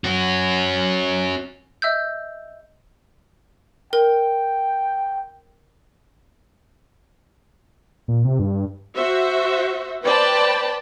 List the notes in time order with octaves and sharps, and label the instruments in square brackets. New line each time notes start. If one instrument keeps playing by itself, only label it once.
[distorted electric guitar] C#4 F#4
[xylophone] D#5 E5 E6 G6
[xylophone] A#4 [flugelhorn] G5
[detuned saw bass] A#2
C3
G2
[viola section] F#4 C5 E5
B4 C5 D5 G5 A5 B5